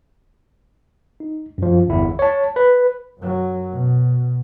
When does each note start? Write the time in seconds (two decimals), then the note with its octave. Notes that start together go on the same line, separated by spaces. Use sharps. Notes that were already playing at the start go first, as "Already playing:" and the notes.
1.20 D#4
1.58 F#2 F3
1.88 G1 E2 E4
2.19 C#5 A5
2.56 B4
3.19 F#2 F#3
3.72 B2